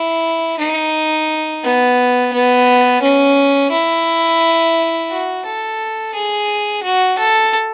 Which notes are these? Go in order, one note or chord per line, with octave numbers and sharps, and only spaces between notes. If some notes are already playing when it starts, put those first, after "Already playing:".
Already playing: E4
D#4
B3
B3
C#4
E4
F#4
A4
G#4
F#4
A4